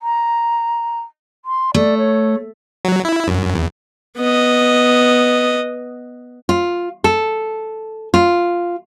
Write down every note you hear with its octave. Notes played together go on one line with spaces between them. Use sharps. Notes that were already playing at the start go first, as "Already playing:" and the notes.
A#5
C6
A3 D5
C#5
F#3
E4
F#2
E2
B3 D#5
F4
A4
F4